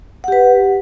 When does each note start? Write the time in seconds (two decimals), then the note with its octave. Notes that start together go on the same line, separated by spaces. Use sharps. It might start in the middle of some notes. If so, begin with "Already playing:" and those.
0.24 F#5
0.28 G4
0.32 B4